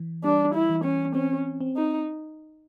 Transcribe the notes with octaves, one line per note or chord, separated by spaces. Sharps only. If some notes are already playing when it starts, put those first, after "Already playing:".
Already playing: E3
G3 D4
E4
E3
C#4
C4 C#4
C4
D#4